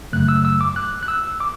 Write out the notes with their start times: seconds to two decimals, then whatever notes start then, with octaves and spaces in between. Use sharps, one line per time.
0.13 F#2 C#3 F#3 A3 F#6
0.29 E6
0.45 E6
0.61 D6
0.76 F#6
1.03 F#6
1.08 E6
1.40 D6